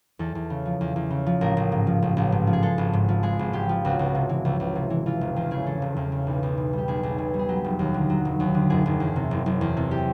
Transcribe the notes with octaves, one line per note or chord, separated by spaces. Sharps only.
E2 A4
E2
C#3
F3
E2
E2
C#3
F3
A1 A#4
A1
G#2
F3
A1
A1
G#2
F3
G#4
G#3 A4
G#1
G#2
F3
G#3 G#4
G#1
G#2 G4
F3
C#2 F#4
C#2
C3
E3
C#2
C#2
C3
E3
E3 F4
E1
E2 F4
C#3 G#4
E3 A4
E1
E2
C#3
B1
B1
B2
G3 G4
B1 G#4
B1
B2
G3
G#4
F#3 G4
F1
D#2
D3
F#3
F1
D#2
D3
F#1 G#4
F#1
E2
C3
F#1
F#1
E2
C3
G4